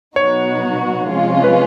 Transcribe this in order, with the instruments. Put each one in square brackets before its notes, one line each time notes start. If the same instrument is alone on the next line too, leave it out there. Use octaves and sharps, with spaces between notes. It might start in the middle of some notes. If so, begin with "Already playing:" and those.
[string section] B2 F#3 B3 D#4 F#4 [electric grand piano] C#5
[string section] C3 F3 G#3 C#4 F4
[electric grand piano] B4